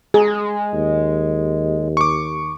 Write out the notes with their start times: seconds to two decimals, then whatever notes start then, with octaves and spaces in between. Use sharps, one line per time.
0.14 G#3 G#4
0.74 D#2
1.97 C#6 D6